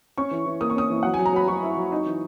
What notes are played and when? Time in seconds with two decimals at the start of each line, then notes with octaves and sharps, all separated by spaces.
0.18 C#4 C#6
0.31 E3
0.46 E3
0.61 A#3 D#6
0.70 C#6
0.76 C#4 D#6
0.90 E3
1.03 F#3 F#5
1.14 G#5
1.19 F#3
1.26 A#5
1.33 F#3 B5
1.48 F#3 C#6
1.63 E4
1.77 F#3
1.92 D#4
2.06 E3